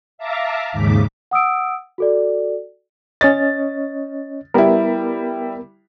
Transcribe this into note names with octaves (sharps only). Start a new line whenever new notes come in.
E5 F5 A5 A#5 D6
D#2 G#2 C#3 D6 B6
F#5 D#6 E6 D7
F#4 A4 D5
C#4 C#5 D#5 A6
G3 B3 E4 A#4